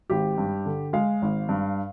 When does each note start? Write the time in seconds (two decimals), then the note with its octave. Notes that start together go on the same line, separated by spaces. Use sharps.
0.10 G#1 G4
0.38 G2
0.65 D3
0.93 G#3 F5
1.22 G#1
1.49 G2